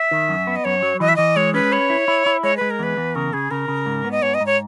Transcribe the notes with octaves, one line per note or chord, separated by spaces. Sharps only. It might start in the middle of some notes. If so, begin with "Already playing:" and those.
Already playing: E5
D#3
F#2
B3
D#5
F#2 C#5
F#3
E3 D#5
E5
E3 D#5
G#3 C#5
C#4 B4
B4 C#5
E4
E4
E4
G#3 C#5
G#3 B4
A#4
E2 B4
E2
C#3 A#4
C#3 G#4
C#3 A#4
C#3
G#2
B3
D#5
G#2 C#5
D#5
G#2
C#5